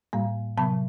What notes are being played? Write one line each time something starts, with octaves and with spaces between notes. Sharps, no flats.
A2 G3 A#3
C3 F#3 B3 A5 B5